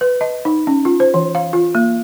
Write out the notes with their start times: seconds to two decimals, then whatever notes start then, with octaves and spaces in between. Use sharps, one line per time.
0.01 B4
0.21 D#5
0.45 D#4
0.67 C#4
0.85 F4
1.00 C5
1.14 E3
1.35 F5
1.53 F4
1.75 A#3